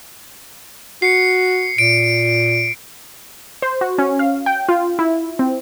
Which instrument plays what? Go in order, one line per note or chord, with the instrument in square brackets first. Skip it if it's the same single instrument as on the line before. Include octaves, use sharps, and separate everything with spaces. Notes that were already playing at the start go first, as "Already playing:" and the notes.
[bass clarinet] F#4 [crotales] C7 C#7
[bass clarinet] A#2 [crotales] D7
[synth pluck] C5
F#4
C#4
F5
G5
F4
E4
C4